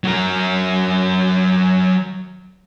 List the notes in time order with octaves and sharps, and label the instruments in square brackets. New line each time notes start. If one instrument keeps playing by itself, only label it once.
[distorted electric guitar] F#3 A#4